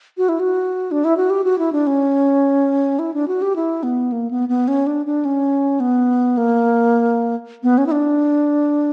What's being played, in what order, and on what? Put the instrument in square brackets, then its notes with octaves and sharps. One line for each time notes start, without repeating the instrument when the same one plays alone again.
[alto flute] F#4
E4
F#4
D4
E4
F#4
G4
F#4
E4
D4
C#4
E4
D4
F#4
G4
E4
B3
A#3
B3
B3
C#4
D4
D4
C#4
B3
A#3
B3
C#4
E4
D4